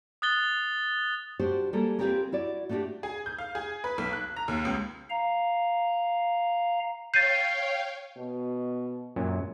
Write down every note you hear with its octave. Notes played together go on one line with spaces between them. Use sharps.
D#6 F#6 A6 G7
D4 F#4 G4 C5
G3 G#3 A#3 A4 A#4
C4 F4 G4 G#4 A#4 B4
E4 F#4 D5
A3 B3 D4 D#4 F#4 G4
G#4
G6
F5
G#4
B4
B1
F#6
A#5
D#2
C#2
F5 A#5
C#5 F5 G5 G6 A6 C7 D#7
B2
F#2 A#2 F#3